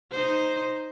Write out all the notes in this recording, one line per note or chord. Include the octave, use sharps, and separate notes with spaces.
D#4 C5